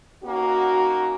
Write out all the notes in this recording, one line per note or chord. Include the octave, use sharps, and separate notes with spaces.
A#3 C#4 D#4 F#4